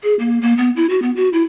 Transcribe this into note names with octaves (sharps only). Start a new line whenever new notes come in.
G#4
A#3
A#3
B3
E4
F#4
B3
F#4
E4